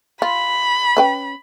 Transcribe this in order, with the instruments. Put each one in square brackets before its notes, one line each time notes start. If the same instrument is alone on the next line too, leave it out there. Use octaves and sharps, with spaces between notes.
[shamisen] F4 [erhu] B5
[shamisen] C#4 B4 G5